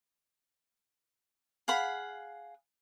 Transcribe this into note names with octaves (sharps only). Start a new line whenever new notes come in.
G#4 F5 F#5 B5